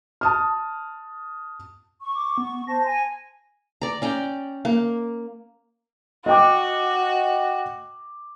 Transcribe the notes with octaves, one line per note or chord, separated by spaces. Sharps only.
A5 D#6 F6
C#6
D6
B3
C5 A5 A#6
G#5
D5 A#5
C#4 D5 G5 A#5
A#3
F#4 D#5 G5 D6